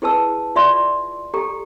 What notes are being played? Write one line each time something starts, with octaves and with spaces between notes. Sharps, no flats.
E4 G#4 B4 A5 E6
F4 D5 E5 C6
G4 A4 A#5